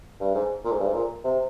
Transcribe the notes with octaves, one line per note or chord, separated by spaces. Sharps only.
G2
G#2
A#2
G#2
G2
G#2
A#2
C3